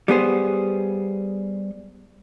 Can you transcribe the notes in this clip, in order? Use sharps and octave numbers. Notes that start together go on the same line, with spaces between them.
G3 B3 G#4 C5